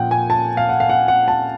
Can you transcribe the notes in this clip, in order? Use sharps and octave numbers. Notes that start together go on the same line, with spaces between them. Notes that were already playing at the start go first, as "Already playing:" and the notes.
Already playing: A#2 F3 F#5 G5
G#5
A5
F5
F#5
F5
F#5
F#5
A5